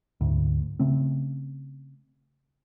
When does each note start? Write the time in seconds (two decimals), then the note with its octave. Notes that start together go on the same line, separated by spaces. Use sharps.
0.21 D2 G#2
0.79 C#3 A3 C4